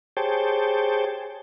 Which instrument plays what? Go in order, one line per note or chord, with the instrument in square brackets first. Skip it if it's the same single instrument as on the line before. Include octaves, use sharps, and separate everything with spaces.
[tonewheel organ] G4 G#4 C5 C#5 G5 A5